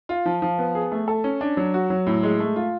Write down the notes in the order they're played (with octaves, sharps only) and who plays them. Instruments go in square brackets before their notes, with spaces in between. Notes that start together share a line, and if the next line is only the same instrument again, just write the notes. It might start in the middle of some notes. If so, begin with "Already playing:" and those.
[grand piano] F4
F3
F3
B3
G#4
A3
A4
C#4
D4
F#3
F#4
F#3
A2
G#3
A3
F4